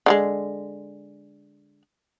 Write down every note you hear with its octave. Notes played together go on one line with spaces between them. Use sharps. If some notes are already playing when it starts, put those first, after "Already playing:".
D3 G3 G#3